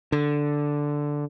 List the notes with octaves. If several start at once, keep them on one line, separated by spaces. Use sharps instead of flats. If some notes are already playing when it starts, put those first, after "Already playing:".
D3